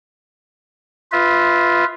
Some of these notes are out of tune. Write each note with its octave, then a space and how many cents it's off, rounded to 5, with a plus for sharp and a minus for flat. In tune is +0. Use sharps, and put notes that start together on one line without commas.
F4 +0 B4 +5 E5 -30